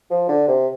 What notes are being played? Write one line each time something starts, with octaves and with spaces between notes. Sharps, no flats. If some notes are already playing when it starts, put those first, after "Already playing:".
F3
D3
C3